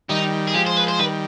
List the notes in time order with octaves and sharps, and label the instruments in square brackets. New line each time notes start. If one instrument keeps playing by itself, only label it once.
[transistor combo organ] D#3 G3 [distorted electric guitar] D#4
[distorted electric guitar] G#4
[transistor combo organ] F3 G#3 [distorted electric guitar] G4
[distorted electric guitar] C5
B4
C5
[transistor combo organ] D#3 G3 [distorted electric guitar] B4